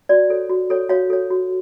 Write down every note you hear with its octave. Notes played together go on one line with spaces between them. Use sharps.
F#4 D5
A4 C#5
F#4
A4 C#5
F#4 C#5 F5
A4 C#5
F#4